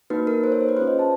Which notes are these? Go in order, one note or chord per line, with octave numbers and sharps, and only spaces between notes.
A#3 D#4 F#4 B4
A#4
C5
C#5
C5
B4
C#4 F4 G#4 C5
D#5
A5